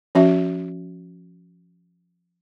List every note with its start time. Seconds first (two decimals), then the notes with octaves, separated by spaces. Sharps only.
0.15 F3 C#4 F#4 E5